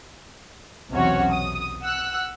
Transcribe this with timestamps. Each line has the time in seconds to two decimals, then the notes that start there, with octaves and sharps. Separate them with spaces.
0.91 B1 E2 C3 C#4 F#4 C#5
1.31 D#6
1.83 F#5 E6 F#6